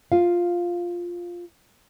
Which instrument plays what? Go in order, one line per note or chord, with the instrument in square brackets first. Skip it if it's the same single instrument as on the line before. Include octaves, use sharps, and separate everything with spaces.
[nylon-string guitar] F4 F5